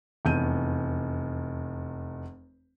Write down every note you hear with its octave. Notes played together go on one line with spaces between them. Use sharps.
F1 E2 G6 D#7